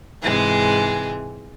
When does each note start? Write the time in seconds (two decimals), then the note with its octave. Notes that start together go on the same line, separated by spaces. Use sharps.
0.23 G#2 C3 E3 G#3 G#4